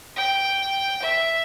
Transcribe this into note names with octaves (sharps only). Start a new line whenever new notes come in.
G5
E5